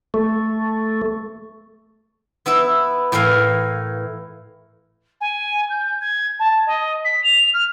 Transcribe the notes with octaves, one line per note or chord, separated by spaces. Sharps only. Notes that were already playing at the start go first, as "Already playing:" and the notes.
A3
B3 E4 B4 E5
A2 E3 A#4 F5
G#5
G6
G#6
A5
D#5
B6
F7
F6